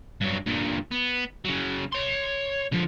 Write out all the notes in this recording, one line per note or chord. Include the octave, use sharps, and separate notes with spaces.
G2 F#3
G2 A#2
B3
C#3 F#3
C#5 C6
D3 F3